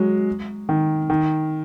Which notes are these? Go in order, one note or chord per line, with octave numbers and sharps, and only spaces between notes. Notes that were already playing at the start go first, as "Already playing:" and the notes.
Already playing: F#3 G#3
D#3
D#3